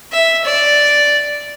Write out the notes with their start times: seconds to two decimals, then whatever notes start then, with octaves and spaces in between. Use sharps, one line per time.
0.12 E5
0.45 D5